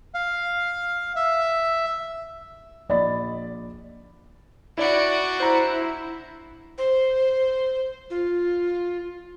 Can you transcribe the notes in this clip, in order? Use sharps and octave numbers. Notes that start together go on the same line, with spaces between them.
F5
E5
A#1 D5 D#5 B5 A6
D4 E4 F#4 D5 B5
E4 C5 A#5
C5
F4